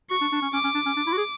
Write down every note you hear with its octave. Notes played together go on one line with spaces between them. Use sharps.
F#4 C#6
D4
D4
C#4
C#4 D6
C#4
D4
C#4
D4
E4
F#4
G#4